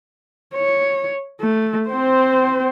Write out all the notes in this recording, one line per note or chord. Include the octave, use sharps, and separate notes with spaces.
C#5
A3
C4 C5